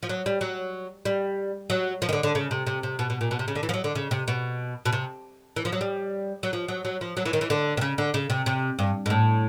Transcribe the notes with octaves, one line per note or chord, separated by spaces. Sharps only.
F3
F#3
G3
F#3
G3
F#3
F3
D#3
D3
D3
C#3
C3
C3
C3
B2
B2
A#2
B2
C3
C#3
D3
E3
F3
F#3
D3
C#3
C3
B2
B2
C3
E3
F3
F#3
G3
F#3
F3
F#3
F#3
F3
F#3
E3
D#3
E3
D3
C3
C#3
D3
C#3
C3
C3
G2
G#2
A2